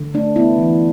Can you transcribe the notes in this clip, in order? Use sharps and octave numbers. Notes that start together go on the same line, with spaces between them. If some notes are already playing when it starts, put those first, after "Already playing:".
Already playing: D3
A3 D4
B3 E4
E3